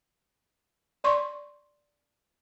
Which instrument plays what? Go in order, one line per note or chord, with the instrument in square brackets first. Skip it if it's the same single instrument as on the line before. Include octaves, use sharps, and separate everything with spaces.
[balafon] D5 C6 C#6